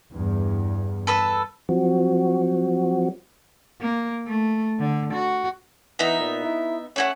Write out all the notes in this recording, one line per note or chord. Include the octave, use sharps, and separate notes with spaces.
E2 G2
A4 B4 E6
F3 F#3 C4 F#4
A#3
A3
D3
F#4
E3 B3 D#4 E5
A#2
E4
A3 C#4 E4 F#5